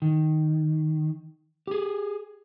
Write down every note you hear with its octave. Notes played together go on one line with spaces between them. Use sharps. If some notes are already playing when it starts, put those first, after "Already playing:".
D#3
G4 G#4